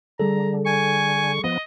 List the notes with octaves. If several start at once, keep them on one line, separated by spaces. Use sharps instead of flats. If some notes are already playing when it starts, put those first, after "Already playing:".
D3 G3 G#4 A4 A#5
G#5 C#6
F3 B3 D#5